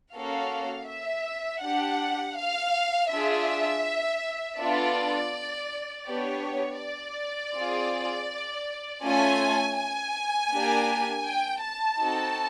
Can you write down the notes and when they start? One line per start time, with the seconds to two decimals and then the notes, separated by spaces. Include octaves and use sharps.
0.14 A#3 C#4 F#4 A4 F5
0.89 E5
1.63 D4 G4 F#5
2.37 F5
3.11 D4 F4 G#4 E5
4.59 B3 D4 F4 A4 D5
6.07 B3 D4 G4 C#5
6.81 D5
7.56 C4 F4 G#4
9.03 A3 C#4 F4 A4 G#5
9.78 G#5
10.51 A#3 D4 G4
11.26 G5
11.63 A5
12.00 C4 D#4 F#4 A4